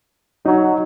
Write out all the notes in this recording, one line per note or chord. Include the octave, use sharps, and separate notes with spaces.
F#3 D#4